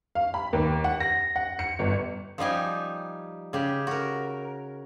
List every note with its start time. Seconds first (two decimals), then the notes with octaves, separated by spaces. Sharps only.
0.15 F5
0.34 B5
0.53 D#2
0.84 F#5
1.00 A#6
1.36 F#5
1.59 C#7
1.79 G1
2.38 F3 G3 D#4 G4 G#5
3.53 C#3 G4
3.87 F#4 A#4